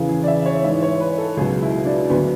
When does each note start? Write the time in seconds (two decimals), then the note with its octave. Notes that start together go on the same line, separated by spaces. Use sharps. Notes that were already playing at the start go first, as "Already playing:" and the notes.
Already playing: E2 C#3 E3
0.09 G#4
0.24 D5
0.28 E5
0.46 C#5
0.64 G#2 E5
0.68 E3
0.83 C#5
1.00 B4
1.18 A4
1.37 C#2 B2 F#3 G#4
1.62 E4
1.86 D4
2.10 D2 D3 F#3 B3